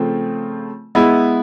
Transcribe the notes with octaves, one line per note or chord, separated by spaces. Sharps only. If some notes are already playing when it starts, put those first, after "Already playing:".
Already playing: C#3 F3 A3 C4
G#3 B3 E4